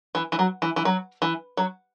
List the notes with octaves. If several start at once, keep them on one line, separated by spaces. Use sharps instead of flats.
E3
E3
F#3
E3
E3
F#3
E3
F#3